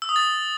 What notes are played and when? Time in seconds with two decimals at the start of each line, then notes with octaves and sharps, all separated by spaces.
0.02 E6
0.09 D#6
0.16 A6